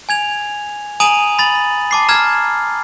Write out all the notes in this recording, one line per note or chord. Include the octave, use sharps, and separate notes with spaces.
G#5 G#6 F7
G#5 A#5 D#6 D#7 F7 F#7
B5 A6 F#7
A5 D6 C7
A#5 F6 G#6